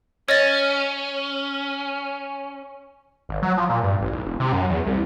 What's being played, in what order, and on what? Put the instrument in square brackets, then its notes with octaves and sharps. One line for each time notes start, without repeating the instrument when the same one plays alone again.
[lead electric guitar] C#4 [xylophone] C#5 D#5 A6
[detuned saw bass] G#1
F#3
F3
A#2
G2
A1
B1
E1
C3
F#2
E2
C2